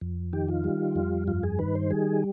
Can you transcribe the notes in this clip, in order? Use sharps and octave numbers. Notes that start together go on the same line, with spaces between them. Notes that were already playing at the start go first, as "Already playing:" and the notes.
F2
D#3 G4
F4
G3
F2
G2 F4
G#4
D#3 B4
C5
G3 G#4